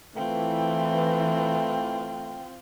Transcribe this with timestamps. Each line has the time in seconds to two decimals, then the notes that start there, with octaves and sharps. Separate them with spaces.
0.16 E3 A3 C4 F4 G5